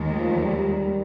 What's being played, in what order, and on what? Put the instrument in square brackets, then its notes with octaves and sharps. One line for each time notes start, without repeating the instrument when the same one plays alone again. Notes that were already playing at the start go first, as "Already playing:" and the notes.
Already playing: [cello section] D#2 D#3 G#3
[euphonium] F3
G3